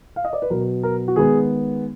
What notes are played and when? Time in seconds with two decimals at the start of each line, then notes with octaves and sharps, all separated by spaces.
0.16 F5
0.25 D#5
0.33 D5
0.42 B4
0.50 B2 F#3 B3 A#4
0.83 A#4
1.08 F#4
1.16 D#3 G#3 B3 G#4